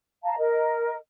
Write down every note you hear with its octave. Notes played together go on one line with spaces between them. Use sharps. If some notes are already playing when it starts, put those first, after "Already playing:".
F5 A5 A#5
A#4 D#5